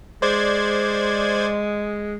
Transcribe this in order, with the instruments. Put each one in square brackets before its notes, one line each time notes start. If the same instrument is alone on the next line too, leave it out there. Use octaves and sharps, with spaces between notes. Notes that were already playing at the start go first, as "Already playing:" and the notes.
[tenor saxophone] G#3 [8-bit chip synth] C5 D5 G#6